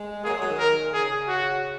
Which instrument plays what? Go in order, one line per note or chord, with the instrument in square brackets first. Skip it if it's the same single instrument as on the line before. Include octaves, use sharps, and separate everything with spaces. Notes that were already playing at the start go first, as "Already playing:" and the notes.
Already playing: [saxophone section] G#3
[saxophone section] F#3 A#3 [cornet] G#4
[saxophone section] G#3
F#3
D#3
[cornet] A#4
[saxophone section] A#2
[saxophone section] C#3 [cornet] G#4
[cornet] F#4